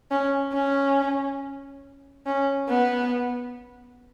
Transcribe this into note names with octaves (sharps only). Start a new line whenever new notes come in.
C#4
C#4
C#4
B3